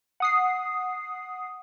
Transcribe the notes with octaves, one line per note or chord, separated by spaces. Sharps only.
F#5 D#6 C7